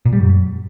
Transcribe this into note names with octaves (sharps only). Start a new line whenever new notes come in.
A#2
G3
F#2